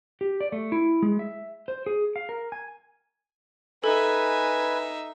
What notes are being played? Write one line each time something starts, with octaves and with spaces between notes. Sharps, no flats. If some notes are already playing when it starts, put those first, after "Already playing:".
G4
D5
A3
E4
G#3
E5
C5
G#4
F5
A#4
G#5
D#4 A4 B4 E5 G#5